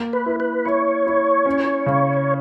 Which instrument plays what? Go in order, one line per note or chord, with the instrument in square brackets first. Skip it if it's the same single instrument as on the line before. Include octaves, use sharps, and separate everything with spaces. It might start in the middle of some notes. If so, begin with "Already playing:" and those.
Already playing: [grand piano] A#3
[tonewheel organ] B4
[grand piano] E4
[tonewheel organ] B4
[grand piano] E4 [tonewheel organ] C#5
[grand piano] E4
C#4
C#3